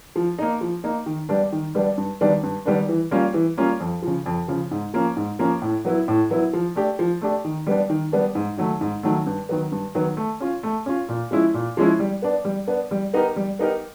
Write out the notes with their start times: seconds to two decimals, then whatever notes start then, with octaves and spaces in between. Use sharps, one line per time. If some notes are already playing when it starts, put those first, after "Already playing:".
0.16 F3
0.39 A#3 D#4
0.61 F3
0.84 A#3 D#4
1.06 D#3
1.29 G3 B3 D4
1.52 D#3
1.75 G3 B3 D4
1.98 G2
2.21 D#3 G3 B3 D4
2.43 G2
2.65 D#3 G3 B3 D4
2.89 E3
3.11 G3 A#3 C#4 F4
3.34 E3
3.57 G3 A#3 C#4 F4
3.80 F2
4.02 C#3 F3
4.26 F2
4.48 C#3 F3
4.71 G#2
4.94 F3 A#3 C#4
5.17 G#2
5.39 F3 A#3 C#4
5.62 A2
5.85 F#3 B3 E4
6.08 A2
6.30 F#3 B3 E4
6.53 F3
6.76 A3 D4 G4
6.99 F3
7.21 A3 D4 G4
7.44 D#3
7.66 G3 B3 D4
7.90 D#3
8.12 G3 B3 D4
8.35 G#2
8.57 D#3 F#3 A3
8.81 G#2
9.03 D#3 F#3 A3
9.26 G2
9.49 D#3 F#3 B3
9.72 G2
9.95 D#3 F#3 B3
10.17 A3
10.40 C#4 F4
10.63 A3
10.86 C#4 F4
11.09 A#2
11.31 F3 G#3 C#4 E4
11.54 A#2
11.77 F3 G#3 C#4 E4
11.99 G3
12.22 B3 D4
12.45 G3
12.68 B3 D4
12.91 G3
13.13 B3 D#4 G4 A#4
13.36 G3
13.59 B3 D#4 G4 A#4